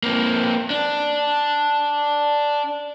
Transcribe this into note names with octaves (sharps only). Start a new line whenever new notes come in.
A#3 C4
D4